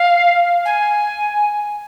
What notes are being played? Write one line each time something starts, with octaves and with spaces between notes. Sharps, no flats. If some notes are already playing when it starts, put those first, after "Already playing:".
Already playing: F5
G#5